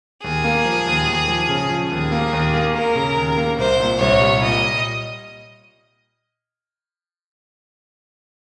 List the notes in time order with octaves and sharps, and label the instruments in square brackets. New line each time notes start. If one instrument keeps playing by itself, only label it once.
[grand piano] D#2 [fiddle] G#4
[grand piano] A#3
F3
D#2
D#2
F3
C#3
F3
[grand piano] D#2 [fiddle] G#4
[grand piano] A#3
D#2
A#3
[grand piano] A#3 [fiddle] A#4
[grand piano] C#3
D#2
A#3
[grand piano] C2 [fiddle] C5
[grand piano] A#2
[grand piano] C2 [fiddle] C#5
[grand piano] G3
[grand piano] A#2 [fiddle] D#5